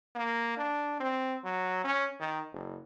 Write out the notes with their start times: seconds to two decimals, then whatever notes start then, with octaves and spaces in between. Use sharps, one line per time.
0.15 A#3
0.57 D4
1.00 C4
1.44 F#3
1.84 C#4
2.20 D#3
2.53 F#1